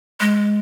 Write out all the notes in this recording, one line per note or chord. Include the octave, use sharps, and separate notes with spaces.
G#3